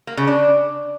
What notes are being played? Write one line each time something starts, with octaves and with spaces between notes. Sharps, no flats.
A#3
C#3
D4